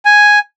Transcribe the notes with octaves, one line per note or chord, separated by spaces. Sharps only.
G#5